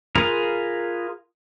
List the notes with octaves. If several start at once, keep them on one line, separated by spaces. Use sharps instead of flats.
F4 G#4 A#4 B4 A#5